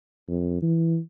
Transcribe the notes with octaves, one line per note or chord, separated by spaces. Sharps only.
F2
E3